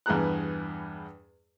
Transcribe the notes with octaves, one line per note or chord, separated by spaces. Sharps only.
E2 G2 B3 G#4 A#5 F#6